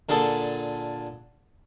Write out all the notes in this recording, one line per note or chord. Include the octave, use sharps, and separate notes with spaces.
A#2 D3 G#4 A4